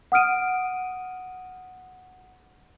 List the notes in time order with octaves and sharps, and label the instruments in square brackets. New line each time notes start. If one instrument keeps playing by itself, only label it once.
[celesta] F#5 D#6 F6 D7 D#7